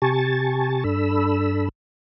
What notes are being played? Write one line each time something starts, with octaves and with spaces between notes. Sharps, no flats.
C3 G4 G#5 A5 C#6 A6
G2 D4 A4 B5 E6